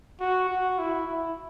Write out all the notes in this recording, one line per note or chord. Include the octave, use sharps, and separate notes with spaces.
F#4
F#4
E4
E4